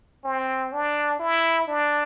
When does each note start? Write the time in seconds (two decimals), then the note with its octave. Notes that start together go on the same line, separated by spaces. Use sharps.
0.24 C4
0.73 D4
1.19 E4
1.68 D4